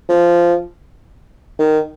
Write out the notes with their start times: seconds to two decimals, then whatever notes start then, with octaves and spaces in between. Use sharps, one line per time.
0.09 F3
1.59 D#3